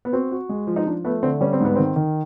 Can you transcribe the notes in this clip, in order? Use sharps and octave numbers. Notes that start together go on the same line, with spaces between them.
B3
C4 F#4
F#4
G#3
F3
D#4
F3 D4
A3 B3
D3 C4
G3 C#4
C4
G#2 B3
D#3 C4
D#3